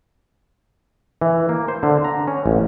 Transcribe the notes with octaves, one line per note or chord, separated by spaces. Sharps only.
E3
A#3
C5
D3
A#5
C#4
A1